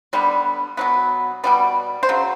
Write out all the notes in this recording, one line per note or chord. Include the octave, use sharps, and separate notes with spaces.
D3 G3 B3
B2 F#3 B3
B2 G3 B3 D5
C5
C#3 F#3